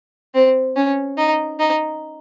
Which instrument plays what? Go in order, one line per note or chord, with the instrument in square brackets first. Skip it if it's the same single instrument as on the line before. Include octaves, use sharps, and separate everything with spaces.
[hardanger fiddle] C4
C#4
D#4
D#4